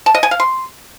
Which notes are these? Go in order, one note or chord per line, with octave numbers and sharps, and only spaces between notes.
A5
D#5
G#5
F5
C6